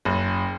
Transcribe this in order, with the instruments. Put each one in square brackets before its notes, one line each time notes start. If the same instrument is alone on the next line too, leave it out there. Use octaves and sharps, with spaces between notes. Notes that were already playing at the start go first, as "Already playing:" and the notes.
[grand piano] F#1